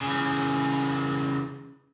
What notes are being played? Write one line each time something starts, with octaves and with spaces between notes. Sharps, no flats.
C#3 E3